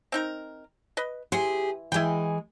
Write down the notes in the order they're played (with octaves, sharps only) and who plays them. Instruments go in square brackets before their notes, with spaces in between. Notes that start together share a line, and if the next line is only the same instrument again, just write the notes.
[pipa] C4 D#4 A#4
B4 D#5
[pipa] E3 F#5 C6 [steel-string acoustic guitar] G4 G#4
[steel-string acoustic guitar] E3 G#3 [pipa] E4 G5